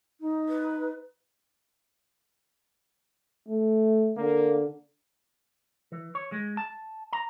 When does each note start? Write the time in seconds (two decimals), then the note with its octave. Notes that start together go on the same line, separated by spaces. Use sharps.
0.20 D#4
0.49 B4
3.48 A3
4.17 D3 A#3
5.92 E3
6.15 C#5
6.32 G#3
6.57 A5
7.13 A#5